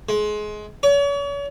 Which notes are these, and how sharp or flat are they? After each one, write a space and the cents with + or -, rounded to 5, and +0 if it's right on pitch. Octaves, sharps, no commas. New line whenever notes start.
G#3 +25
C#5 +40